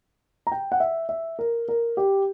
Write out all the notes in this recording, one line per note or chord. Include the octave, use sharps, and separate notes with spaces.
A#5
G5
F#5
E5
E5
A#4
A#4
G4